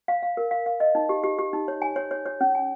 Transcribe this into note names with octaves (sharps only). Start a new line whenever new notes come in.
F5
F5
A#4
F5
F5
D#5
D#4
G4
G4
G4
D#4
C#5
G#5
C#5
C#5
C#5
C#4
G#5